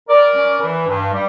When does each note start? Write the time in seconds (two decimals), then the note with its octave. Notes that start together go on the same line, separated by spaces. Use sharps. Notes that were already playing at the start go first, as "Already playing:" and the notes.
0.08 G3 A#4 D5
0.35 C#4
0.60 E3
0.87 G2
1.13 G3